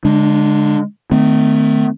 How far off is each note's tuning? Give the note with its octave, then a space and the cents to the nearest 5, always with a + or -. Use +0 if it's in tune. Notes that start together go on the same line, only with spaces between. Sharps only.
D3 -25 G#3 +0 D4 +30
D#3 -25 A3 +0 C4 -45